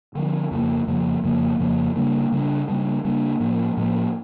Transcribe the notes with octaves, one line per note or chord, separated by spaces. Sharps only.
D3 F3 C#4
F2 C#3 F3 A#3
F2 C#3 F3 A#3
F2 C#3 F3 A#3
F2 C#3 F3 A#3
C#3 G3 A#3 D4
C#3 G3 A#3 D4
C#3 G3 A#3 D4
C#3 G3 A#3 D4
A2 F3 A#3 C#4
A2 F3 A#3 C#4